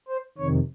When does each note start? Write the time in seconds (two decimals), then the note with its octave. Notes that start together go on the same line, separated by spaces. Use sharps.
0.08 C5
0.38 F2 C3 D#3 C#5